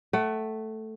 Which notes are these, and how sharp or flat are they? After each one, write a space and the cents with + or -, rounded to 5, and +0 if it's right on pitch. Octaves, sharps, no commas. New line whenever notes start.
A3 +0 F#5 +35